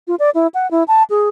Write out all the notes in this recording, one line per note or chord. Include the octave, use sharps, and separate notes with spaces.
F4
D5
E4
F#5
E4
A5
G#4